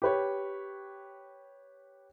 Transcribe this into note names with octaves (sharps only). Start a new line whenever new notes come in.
G4 B4 C#5